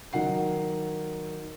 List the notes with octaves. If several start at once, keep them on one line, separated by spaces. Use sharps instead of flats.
D#3 F#3 F#5 C7